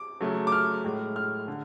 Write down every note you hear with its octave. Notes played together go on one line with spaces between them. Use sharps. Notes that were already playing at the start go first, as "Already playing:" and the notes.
Already playing: D6
C#3 F#3 A3
D6
F6
A2 G#3
F6
D3